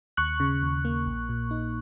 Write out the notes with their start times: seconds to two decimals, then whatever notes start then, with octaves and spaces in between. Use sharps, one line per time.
0.17 D#2 C#6 F#6
0.40 C#3
0.63 D#2
0.85 A#3
1.06 A#1
1.29 A#2
1.51 D#4